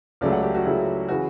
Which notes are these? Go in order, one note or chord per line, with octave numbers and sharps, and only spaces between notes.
C#2 C#3 F#3 A3 D5
F#5
G4
F#4
C#2 C#3 F#3 A3 E4
C#3 E3 F#4